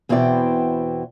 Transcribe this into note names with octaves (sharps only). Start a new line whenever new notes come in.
E2 B2 C4 E4 D5 G5